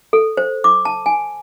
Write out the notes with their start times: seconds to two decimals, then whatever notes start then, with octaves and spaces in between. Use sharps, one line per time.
0.13 A4
0.37 C5
0.64 D6
0.85 A5
1.06 G#5